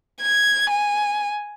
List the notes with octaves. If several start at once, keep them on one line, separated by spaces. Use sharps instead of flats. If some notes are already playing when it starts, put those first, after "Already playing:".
G#6
G#5